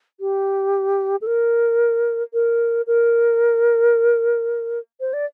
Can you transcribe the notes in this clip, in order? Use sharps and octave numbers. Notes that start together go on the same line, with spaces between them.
G4
A4
A#4
A#4
A#4
C5
D5